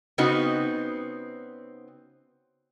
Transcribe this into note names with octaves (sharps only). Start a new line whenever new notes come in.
C#3 B3 C4 D#4 F#4